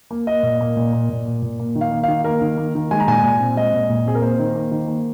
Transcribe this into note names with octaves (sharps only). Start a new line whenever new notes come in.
A#3
A#3 D#5
A#2
A#3
A#2
A#3
A#2
A#3
A#2
A#3
D#3
F5
A#3
D#3 F5
A#3 A#4
D#3
A#3
D#3
G#3 G#5
A#5
A#2 G#5
A#2
C4
G#3 D#5
A#2
A#2
C4 G#4
A#4
A#3 C5
D#3
A#3
D#3
A#3